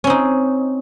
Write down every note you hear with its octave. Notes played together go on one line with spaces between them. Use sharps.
C4 C#4 D#4